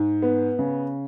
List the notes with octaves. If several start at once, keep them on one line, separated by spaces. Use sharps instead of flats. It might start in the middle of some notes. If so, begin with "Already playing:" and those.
Already playing: G#2
B3
C#3